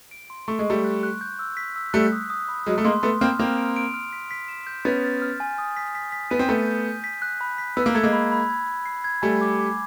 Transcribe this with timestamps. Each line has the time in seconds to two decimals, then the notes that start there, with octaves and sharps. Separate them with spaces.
0.11 D7
0.30 C6
0.48 A3 C#6
0.59 G#3
0.66 G3 A3 C#6
0.84 F#6
1.03 F#6
1.21 G6
1.39 E6
1.57 B6
1.76 E6
1.93 G3 A3 F#6
2.12 D#6
2.30 D#6
2.49 B5
2.66 F#3 G#3 F6
2.78 A3
2.84 G#3 A#3 C6
3.03 A3 B3 C6
3.21 A#3 C4 F6
3.39 A#3 C4 F7
3.58 D7
3.76 D7
3.94 F6
4.13 B6
4.31 B6
4.48 E7
4.67 G6
4.85 B3 C#4 A6
5.04 A6
5.22 F6
5.40 G#5
5.58 D#6
5.77 B6
5.95 B6
6.12 B6
6.30 B3 D#7
6.39 C4
6.49 A3 B3 G6
6.67 G6
6.86 G6
7.04 B6
7.22 F#6
7.41 B5
7.58 B6
7.77 B3 E6
7.86 A#3
7.95 A3 G#6
8.04 G#3 A#3
8.13 B5
8.32 B5
8.50 G#6
8.68 G#6
8.86 C7
9.04 G#6
9.22 G3 A3 G#5
9.41 D6
9.59 D6